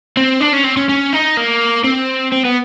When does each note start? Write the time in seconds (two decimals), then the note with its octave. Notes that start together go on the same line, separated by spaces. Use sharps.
0.17 C4
0.41 D4
0.53 C#4
0.64 C4
0.77 C#4
0.89 C#4
1.13 D#4
1.37 A#3
1.84 C4
2.32 C4
2.45 B3